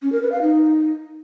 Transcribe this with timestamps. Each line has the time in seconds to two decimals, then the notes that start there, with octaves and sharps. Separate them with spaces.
0.03 C#4
0.12 A#4
0.22 B4
0.32 F5
0.42 D#4